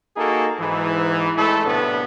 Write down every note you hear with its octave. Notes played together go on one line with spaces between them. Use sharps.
A#3 D#4 F#4 G#4 A4
G#2 E3
A1 G#3 A3 E4 A4
C2 A2 B3 D4 B4